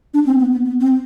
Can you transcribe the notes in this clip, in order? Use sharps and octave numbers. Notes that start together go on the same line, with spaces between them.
D4
C4
B3
B3
B3
C4